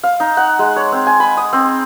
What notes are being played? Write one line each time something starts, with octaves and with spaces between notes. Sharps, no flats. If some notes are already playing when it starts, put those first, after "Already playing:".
F5
D#4
F#5
G#3
C#5
C4
G#5
B5
D#6
C4